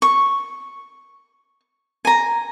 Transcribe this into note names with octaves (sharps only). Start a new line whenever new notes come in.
C#6
G#5 A#5